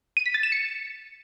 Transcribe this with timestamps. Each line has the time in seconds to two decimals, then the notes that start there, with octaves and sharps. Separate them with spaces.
0.17 D#7
0.26 B6
0.34 A6
0.43 E7
0.52 C#7